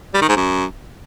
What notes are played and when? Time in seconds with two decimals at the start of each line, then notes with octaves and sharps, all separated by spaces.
0.14 G3
0.21 D#3
0.29 G#2
0.36 F#2